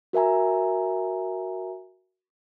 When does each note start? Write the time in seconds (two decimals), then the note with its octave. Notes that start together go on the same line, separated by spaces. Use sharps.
0.13 F#4 A#4 E5 G#5 A#5